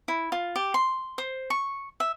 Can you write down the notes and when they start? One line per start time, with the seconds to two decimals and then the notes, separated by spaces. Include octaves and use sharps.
0.08 E4
0.32 F4
0.56 G4
0.74 C6
1.18 C5
1.50 C#6
2.00 E5